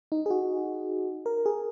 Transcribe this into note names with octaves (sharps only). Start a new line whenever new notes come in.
D#4
G#4
F#4
A#4
G#4